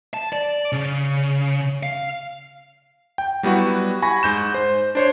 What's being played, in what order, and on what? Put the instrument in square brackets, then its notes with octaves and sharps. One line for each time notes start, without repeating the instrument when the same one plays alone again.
[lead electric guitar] A5
D5
C#3
F5
[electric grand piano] G5
F#3 G3 B3 E4 F#4
G#5 B5 C#6 A#6
G#2 G6 E7
C5
D4 C5 C#5